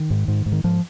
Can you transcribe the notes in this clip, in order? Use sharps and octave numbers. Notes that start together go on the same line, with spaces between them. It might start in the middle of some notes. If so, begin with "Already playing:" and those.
Already playing: D#3
G#2
G#2
G#2
D#3
G#2 F3